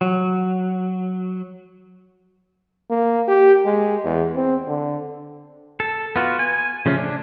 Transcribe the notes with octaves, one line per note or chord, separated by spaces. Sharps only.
F#3
A#3
G4
G#3
E2
C4
D3
A4
B3 F4 F#4
G#5
C#3 F3 A3 C#4
D4